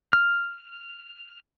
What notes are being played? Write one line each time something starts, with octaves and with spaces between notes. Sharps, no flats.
F6